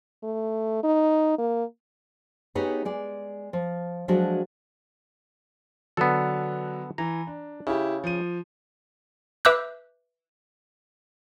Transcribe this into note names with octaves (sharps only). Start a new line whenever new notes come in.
A3
D#4
A#3
B3 D#4 G4 G#4 B4 C#5
G#3 D5
F3
F3 F#3 G#3 D4 F#4 A4
D3 F#3 B3 A4
E3 A#5
D4
C#3 E4 G4
F3 D#7
B4 E5 D6 E6 F#6 G6